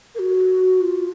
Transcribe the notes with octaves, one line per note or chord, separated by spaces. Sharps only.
A#4
F#4
F4